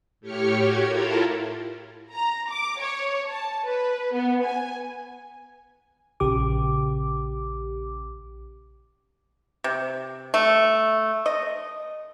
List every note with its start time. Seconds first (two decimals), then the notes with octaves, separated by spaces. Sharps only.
0.21 A2 G4 C#5 F6 C#7
0.55 F#4 G4 G#6
0.85 E4 F4 A4 A#4
2.12 A#5
2.50 D6
2.82 C#5
3.29 A5
3.65 B4
4.14 B3
4.44 G#5
6.20 A#1 C#3 G4 D6
9.64 C3
10.34 A3
11.26 D#5